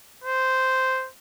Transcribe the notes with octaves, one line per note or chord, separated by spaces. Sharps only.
C5